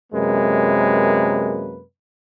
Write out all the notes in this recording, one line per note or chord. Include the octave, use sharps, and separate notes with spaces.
F#2 C3 G#3 A#3 B4